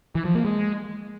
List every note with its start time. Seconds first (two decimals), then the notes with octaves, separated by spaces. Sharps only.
0.15 E3
0.25 F3
0.35 A#3
0.45 G#3